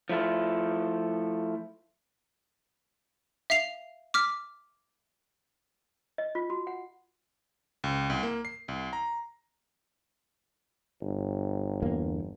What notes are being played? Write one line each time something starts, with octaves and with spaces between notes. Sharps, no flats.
F3 A3 E4 F4
E5 F5 C7 F7
D6 F6 B6
D#5
F4
F#4
F#5
C#2
C2
A#3
C7
C2
A#5
G1
E2 D3 A#3